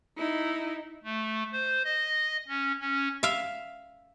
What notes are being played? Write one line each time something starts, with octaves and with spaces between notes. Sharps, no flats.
D#4 E4
A3
C5
D#5
C#4
C#4
E5 F5